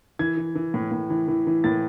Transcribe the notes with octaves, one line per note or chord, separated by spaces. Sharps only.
E3 G#6
E3
E3
A2
A2
E3
E3
E3
A2 A6